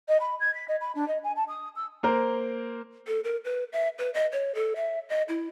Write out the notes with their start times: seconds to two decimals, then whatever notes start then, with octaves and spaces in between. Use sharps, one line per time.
0.08 D#5
0.20 B5
0.40 G#6
0.54 B6
0.68 D#5
0.81 B5
0.95 D4
1.08 D#5
1.23 G#5
1.36 A5
1.48 D#6
1.76 E6
2.03 A#3 A#4 C5
3.07 A4
3.24 A#4
3.45 B4
3.73 E5
3.99 B4
4.14 D#5
4.32 C#5
4.55 A4
4.76 E5
5.09 D#5
5.29 E4